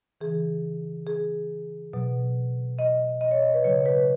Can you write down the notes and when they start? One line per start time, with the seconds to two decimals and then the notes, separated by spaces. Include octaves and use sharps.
0.21 C#3 E3 G#4
1.07 G#4
1.93 B2 F#3
2.79 D#5
3.21 D#5
3.31 C#5
3.43 D#5
3.54 B4
3.64 C#3 F#3 C#5
3.86 B4